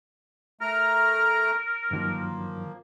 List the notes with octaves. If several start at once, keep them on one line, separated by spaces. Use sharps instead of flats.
A3 A#4 A#5 F6
G2 D#3 F3 F#3 A#3